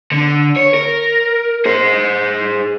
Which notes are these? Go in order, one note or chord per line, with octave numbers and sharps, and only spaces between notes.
D3
C#5
A#4
G#4 C5